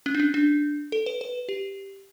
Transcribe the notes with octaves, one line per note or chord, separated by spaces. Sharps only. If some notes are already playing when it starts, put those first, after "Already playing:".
C#4
D4
C#4
D4
A4
B4
B4
G4